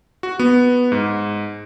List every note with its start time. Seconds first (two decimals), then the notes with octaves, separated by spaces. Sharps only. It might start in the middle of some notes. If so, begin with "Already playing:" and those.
0.23 F#4
0.39 B3
0.92 G#2